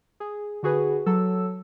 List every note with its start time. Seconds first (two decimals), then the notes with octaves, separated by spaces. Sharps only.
0.20 G#4
0.63 D3 F#4 G#4 B4
1.06 F#3 A4 E6